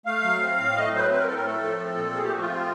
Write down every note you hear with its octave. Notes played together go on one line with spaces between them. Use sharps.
A3 F5
F#3
C4
A2
A3 D#5
F#3 C5
B4
C4 B4
A#4
A2 A4
A#4
A3 A4
F3
C4
A#2
A3 G#4
G4
F3 F#4
F4
C4